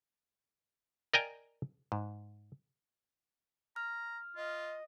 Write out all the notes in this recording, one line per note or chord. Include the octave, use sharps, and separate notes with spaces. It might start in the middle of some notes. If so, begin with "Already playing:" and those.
A#4 D5 D#5 G5 G#5 A#5
G#2
A#5 F6
F4 D#5